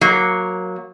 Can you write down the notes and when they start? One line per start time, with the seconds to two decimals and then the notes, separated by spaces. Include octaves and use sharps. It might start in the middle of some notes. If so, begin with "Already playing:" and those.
0.01 F#3 A#3